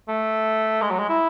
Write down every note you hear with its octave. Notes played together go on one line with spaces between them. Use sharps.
A3
G#3
F#3
G#3
E4